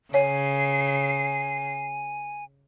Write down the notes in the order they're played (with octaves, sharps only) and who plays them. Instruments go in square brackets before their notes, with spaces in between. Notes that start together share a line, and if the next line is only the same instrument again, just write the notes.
[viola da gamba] C#3 [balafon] C#5 [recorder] G#5 [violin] C7